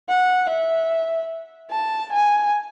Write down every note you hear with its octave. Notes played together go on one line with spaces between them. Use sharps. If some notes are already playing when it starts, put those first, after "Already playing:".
F#5
E5
A5
G#5